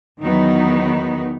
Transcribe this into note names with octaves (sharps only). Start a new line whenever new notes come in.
E2 D#3 F#3 B3 D#4